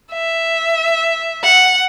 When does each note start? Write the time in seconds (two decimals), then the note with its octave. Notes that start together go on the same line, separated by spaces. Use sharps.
0.13 E5
1.43 F#5